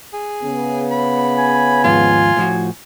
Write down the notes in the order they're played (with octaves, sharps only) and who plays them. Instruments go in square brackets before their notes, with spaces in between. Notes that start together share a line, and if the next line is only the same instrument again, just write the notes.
[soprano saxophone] G#4
[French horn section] C#3 B3
[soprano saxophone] B5
[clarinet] G#5
[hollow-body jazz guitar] D#2 G#2 F3 [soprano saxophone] F4
[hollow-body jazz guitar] A2 F3 F#4